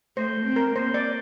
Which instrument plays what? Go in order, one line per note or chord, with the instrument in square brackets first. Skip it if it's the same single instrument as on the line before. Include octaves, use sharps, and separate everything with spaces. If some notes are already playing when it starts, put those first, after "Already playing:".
[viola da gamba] A3 [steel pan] C5
[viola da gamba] C4
[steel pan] A#4
[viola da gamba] A#3 [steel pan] C5
[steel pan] D5